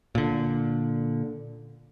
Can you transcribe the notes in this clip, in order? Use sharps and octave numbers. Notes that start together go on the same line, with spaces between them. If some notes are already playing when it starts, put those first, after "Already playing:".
A#2 D3